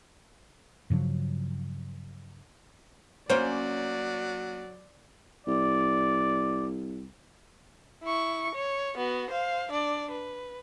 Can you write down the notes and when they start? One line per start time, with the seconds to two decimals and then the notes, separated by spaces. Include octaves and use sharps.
0.90 G2 C#3 F3 F#3
3.30 F#3 A#3 C#4 C5 D5
5.47 C2 D5
8.03 E4 C#6
8.55 C#5
8.97 B3 F#4
9.30 C5 F5
9.71 D4 D5
10.11 B4